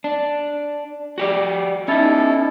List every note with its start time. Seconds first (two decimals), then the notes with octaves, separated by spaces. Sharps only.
0.04 D4
1.18 F#4 G4 D5
1.88 C#4 D#4 E4 A4